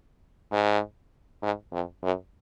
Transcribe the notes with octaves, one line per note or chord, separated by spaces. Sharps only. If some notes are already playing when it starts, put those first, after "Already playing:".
G#2
G#2
F2
F#2